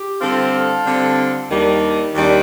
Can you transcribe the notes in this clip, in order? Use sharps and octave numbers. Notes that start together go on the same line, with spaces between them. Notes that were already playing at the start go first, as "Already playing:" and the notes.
Already playing: G4
D3 G3 C4 F4 A4
D3 G3 C4
D#2 D#3 G3 D4
D#2 D#3 G3 D4